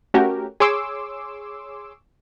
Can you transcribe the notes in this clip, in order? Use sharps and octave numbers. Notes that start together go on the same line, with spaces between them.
A3 C#4 F#4 G4 A#4
G#4 C#5 C6 D6 E6